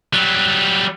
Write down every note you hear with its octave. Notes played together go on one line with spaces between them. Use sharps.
F#3 G3